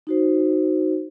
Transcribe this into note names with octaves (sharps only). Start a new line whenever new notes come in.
D#4 F#4 C5